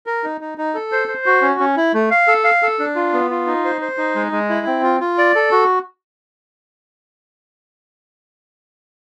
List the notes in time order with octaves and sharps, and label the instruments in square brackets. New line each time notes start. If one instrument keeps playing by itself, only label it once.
[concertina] A#4
D#4
D#4
D#4
A4
C5
C5
F#4
C#4
C#4
E4
A3
F5
A4
F5
A4
D4
F4
B3
F4
D#4
C5
C5
D#4
G#3
G#3
E4
C4
F4
F4
D5
A4
F#4